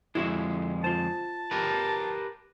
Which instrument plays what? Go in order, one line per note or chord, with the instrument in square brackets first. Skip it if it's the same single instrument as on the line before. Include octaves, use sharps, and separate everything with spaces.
[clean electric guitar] F2 D3 G#3 [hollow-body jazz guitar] E4 F#4 E5
[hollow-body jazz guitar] F4 C5 [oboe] A5
[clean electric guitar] G4 A#4 B4